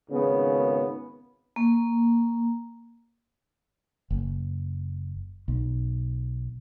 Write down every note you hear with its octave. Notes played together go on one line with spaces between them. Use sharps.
G#1 C#3 B3
A#3
F#1
B1